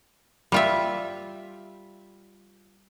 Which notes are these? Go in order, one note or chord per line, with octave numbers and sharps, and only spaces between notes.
G3 F4 E5